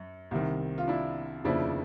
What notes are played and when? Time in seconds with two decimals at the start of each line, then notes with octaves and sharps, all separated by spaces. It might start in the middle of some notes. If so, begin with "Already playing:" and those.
Already playing: F#2
0.31 C2 C3 D#3
0.78 F4
0.88 D4 E4
1.44 F1 D#2 C#3 F3 D4 E4